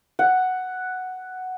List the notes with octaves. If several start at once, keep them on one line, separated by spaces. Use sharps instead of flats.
F#5